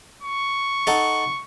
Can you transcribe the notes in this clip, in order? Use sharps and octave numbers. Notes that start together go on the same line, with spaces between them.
C#6
D#4 A4 F#5